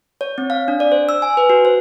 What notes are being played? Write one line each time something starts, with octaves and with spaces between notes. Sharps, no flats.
C#5
C4
F5
D4
D5
C5
E6
G#5
B4
F#4
C5